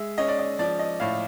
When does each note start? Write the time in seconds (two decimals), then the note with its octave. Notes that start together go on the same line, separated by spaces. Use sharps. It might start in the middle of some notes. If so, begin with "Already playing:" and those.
Already playing: G#3 E5
0.18 C#4 D#5
0.29 D5
0.39 D#5
0.59 F3 D5
0.79 D#5
1.00 A2 F5